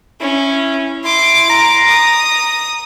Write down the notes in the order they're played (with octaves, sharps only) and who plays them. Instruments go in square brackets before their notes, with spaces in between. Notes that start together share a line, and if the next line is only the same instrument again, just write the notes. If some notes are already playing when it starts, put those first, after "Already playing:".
[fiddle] C#4 [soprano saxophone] E4
[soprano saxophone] E4 [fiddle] C6 D6
[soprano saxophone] A#5
[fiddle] D#6